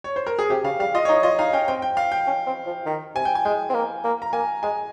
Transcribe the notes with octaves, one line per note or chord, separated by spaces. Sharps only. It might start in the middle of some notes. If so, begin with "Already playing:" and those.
C#5
C5
A#4
G#4
C3 G4
C#3 F5
G3 F5
F4 D#5
C#5
D#4 D#5
F4 D#5
D#4 F5
C#4 G5
C4 G5
G5
F5
G5
C#4
C4
F3
D#3
C3 G#5
G5
G#5
G#3 G5
C4
A#3
A#3
A#5
A#3 G#5
G#3 G#5